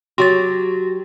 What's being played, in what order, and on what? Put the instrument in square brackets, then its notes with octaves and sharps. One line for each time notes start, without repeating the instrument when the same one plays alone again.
[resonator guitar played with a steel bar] F#3 G4 [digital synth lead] F#4 [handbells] C6 A6